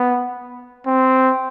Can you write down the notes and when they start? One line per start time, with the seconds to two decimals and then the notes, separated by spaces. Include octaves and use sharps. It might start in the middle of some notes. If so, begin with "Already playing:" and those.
Already playing: B3
0.87 C4